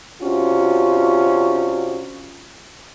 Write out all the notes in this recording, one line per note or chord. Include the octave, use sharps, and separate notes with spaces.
C3 C#4 D4 F4 F#4